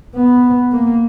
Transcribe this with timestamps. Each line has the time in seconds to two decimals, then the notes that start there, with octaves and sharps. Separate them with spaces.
0.15 B3
0.72 A#3